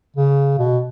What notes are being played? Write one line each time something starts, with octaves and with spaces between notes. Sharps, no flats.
C#3
B2